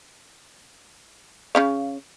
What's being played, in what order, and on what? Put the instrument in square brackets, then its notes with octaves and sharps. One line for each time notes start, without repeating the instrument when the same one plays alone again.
[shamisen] C#3 C#4 F5